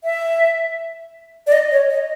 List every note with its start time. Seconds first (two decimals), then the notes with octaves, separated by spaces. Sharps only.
0.04 E5
1.47 D5
1.52 D#5
1.71 C#5
1.90 D#5